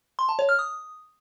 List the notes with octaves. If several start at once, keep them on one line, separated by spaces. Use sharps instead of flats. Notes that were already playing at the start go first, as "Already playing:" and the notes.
C6
A5
C#5
F6
D#6